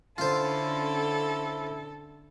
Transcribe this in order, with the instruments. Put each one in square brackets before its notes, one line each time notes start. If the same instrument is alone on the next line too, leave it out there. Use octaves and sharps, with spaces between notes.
[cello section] D3 C#4 [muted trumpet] E4 [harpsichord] F4 C5 [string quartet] A4